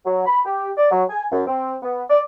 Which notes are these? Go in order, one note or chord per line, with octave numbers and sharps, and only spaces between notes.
F#3
B5
G4
D5
F#3
G#5
F#2
C4
B3
D5